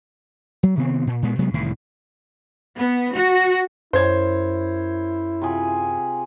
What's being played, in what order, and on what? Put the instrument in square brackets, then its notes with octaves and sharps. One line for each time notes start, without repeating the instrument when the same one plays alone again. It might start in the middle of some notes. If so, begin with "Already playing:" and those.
[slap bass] F#3
C3 D#3 B3 C4
A#2
A#2 G#3 B3
C3 F#3 G#3 B3
C2 A2 D#3 E3
[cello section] B3
F#4
[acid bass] F#2 [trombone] E4 [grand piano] C5 C#5 G#6
[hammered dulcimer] C3 F4 G#4